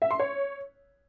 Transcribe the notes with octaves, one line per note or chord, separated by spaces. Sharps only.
E5
C6
C#5